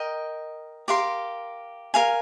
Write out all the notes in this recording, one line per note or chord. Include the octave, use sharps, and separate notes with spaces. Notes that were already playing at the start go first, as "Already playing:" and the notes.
Already playing: A#4 D#5 G5
G4 A#4 F5 C6
A#4 F5 G#5